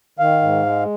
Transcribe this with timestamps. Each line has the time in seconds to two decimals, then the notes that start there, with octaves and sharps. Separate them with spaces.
0.19 D#3 F5
0.42 G#2
0.66 G#3